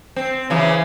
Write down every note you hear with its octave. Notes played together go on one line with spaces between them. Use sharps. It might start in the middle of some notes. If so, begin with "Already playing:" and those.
C4
C#3 E3 F#3